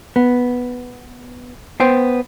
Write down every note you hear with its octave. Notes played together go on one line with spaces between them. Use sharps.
B3
B3 C5 G5